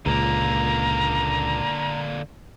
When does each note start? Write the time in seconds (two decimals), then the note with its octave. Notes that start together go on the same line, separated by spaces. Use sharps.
0.06 C#2 A#2 D3 A#3 A#5